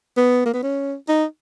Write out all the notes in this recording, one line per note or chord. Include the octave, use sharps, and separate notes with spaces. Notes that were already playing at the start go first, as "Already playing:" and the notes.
B3
A#3
B3
C#4
D#4